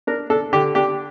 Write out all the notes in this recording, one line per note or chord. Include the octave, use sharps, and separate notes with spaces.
D4 A#4
D4 A4
D3 G4
D4 G4